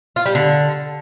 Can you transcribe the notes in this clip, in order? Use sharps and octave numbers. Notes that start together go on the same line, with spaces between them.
F4
G3
D3